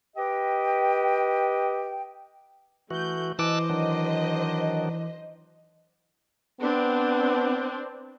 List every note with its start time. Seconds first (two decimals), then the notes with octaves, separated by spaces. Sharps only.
0.17 G4 B4 D#5 G5
2.91 E3 A3 F#4 G6
3.39 E3 C5 D#5 A5 D6 E6 F#6
3.70 D#3 F#3 D4
6.60 B3 C4 D4